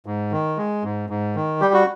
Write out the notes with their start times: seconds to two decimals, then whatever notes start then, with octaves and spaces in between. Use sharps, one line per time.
0.06 G#2
0.32 D#3
0.57 G#3
0.84 G#2
1.10 G#2
1.35 D#3
1.61 G3 G4
1.74 F#4